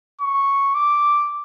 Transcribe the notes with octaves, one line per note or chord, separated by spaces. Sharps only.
C#6
D6